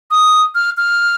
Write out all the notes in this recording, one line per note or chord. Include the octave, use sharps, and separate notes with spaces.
D#6
F6
F6